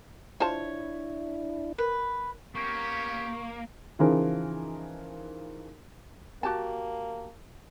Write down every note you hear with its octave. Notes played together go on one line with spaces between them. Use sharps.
D4 E4 F4 C5 C#5 A5
A#4 B4
A#3 B3 C#4 G4 C#6
C#3 E3 F3 D#4 G#4 A#4
A#3 F#4 G4 A5